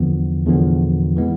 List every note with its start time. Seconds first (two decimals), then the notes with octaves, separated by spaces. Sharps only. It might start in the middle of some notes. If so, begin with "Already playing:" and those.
Already playing: E2 D3 F3 B3
0.47 E2 D3 F3 B3
1.17 E3 G#3 B3